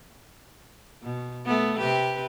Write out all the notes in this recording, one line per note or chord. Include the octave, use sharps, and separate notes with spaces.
B2
A3 B3
C3 G4 B4